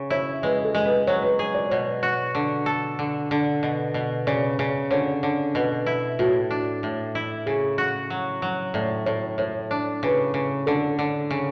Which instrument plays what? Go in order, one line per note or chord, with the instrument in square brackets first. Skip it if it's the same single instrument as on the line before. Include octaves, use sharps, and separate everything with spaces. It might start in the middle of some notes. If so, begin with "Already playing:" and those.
Already playing: [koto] C#3
[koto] E4 [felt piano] C#5
[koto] G#3 [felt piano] B4
[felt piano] A4
[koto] G#3
[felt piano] B4
[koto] F#3 [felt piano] C#5
[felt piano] B4
[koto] G#4
[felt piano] D5
[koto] B2 [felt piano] C#5
[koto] F#4
D3
A4
D3
D3
B2
B2
[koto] C#3 [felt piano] D5
[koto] C#3
[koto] D3 [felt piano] C#5
[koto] D3
[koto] B2 [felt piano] B4
[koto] E4
[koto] A2 [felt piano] F#4
[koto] D4
A2
E4
[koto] C#3 [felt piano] G#4
[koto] F#4
F#3
F#3
[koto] A2 [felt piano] D5
[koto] A2 [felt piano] C#5
[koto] A2 [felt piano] C#5
[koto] D4
[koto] C#3 [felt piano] B4
[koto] C#3
[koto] D3 [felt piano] A4
[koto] D3
C#3